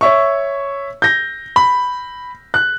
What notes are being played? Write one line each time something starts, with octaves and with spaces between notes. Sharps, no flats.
C#5 E5 C#6
G6 A#6
B5
F#6